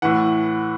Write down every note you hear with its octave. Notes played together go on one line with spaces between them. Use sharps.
A2 E3 F#5